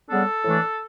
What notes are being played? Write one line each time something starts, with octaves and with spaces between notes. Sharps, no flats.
C#3 G3 B3 D4 A4
A2 E3 A3 D4